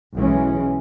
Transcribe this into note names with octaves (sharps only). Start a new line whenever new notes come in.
B1 E3 G#3 C#4